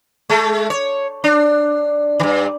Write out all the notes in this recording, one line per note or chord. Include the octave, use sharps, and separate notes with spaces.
G#3 A3
C#5
D4
G2 D#3